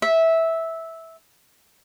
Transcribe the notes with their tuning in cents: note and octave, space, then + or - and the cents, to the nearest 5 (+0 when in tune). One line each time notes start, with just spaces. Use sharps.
E5 -10